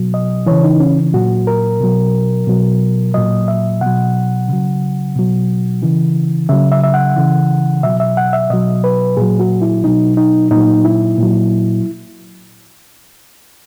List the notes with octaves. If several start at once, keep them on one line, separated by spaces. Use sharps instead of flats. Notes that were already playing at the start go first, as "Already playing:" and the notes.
Already playing: B2 F#3
D#5
C#3 E3 C#5
D#4
C#4
A#2 F#3 F#4
A#4
B2 F#3
B2 F#3
A#2 F#3 D#5
E5
B2 F#3 F#5
C#3 F#3
B2 F#3
C#3 E3
C#3 F#3 E5
E5
E5
F#5
C#3 E3
B2 F#3 E5
E5
F#5
E5
B2 F#3 D#5
B4
A#2 F#3 G#4
F#4
E4
B2 F#3 D#4
D#4
A#2 F#3 D#4
E4
A#2 F#3